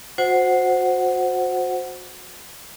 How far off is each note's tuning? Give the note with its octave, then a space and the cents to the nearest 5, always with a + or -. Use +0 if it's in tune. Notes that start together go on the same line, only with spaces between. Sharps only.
F#4 -30 C5 +0 F#5 +0